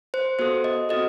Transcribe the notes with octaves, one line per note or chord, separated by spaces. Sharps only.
C5
B3 F#4 A4 C5
D#5
C4 F#4 A4 D#5